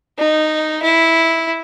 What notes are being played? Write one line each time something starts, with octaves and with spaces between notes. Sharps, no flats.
D#4
E4